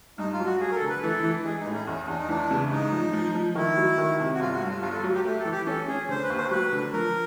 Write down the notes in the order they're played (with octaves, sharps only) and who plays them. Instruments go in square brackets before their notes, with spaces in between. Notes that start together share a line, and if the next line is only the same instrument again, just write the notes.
[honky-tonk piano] G2 [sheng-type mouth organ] D#4
[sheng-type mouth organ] F4
[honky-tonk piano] F#3
[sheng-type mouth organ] F#4
[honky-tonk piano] F#3 [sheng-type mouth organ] G#4
[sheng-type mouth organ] A#4
A4
[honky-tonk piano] D3
[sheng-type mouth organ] B4
[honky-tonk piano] E3 [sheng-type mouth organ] A4
[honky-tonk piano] E3
[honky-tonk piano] G#3 [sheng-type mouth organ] G#4
[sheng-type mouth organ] D#4
[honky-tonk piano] A2
[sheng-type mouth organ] C#4
[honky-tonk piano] E2 [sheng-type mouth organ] C#4
[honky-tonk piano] E2 [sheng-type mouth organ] D4
[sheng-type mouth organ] D#4
[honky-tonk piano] E3 [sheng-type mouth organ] D4
[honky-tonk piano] C#3
[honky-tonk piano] G#2 [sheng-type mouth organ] D#4
[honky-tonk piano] F3
F3
F3
[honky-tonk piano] D#3 [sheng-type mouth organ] E4
[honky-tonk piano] F#3
D#3
C3
[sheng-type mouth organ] F#4
[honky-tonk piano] G1 [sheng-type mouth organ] F4
[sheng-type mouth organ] F#4
[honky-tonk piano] G2
[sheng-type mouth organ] F4
[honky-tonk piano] G1 [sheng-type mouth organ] F4
[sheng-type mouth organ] A4
[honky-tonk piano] F#3
[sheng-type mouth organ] G4
[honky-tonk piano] A3 [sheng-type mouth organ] G4
[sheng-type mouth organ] A4
[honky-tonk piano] E3
[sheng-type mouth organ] G4
[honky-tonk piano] C#4 [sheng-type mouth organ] A4
[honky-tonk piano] C#4 [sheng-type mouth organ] G#4
[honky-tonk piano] D3 [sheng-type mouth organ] C5
[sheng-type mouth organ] B4
[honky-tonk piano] D#2
[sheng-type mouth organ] C5
[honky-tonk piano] F#3 [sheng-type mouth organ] B4
[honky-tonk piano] D3
[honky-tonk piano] F3 [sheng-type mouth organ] A#4